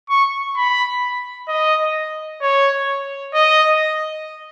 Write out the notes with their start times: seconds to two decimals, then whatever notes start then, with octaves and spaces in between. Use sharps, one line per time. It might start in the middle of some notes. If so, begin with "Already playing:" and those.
0.10 C#6
0.56 B5
1.49 D#5
2.42 C#5
3.34 D#5